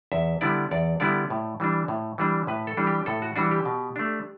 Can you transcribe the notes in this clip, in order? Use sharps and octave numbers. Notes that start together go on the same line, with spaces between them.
E2 E5
D3 G3 B3 E4 D5
E2 D5
D3 G3 B3 E4 D5
A2
E3 G3 D4
A2
E3 G3 D4
A2 B4
A4
E3 G3 D4
G4
A2 A4
F#4
E3 G3 D4 F#4
G4
B2
A3 D4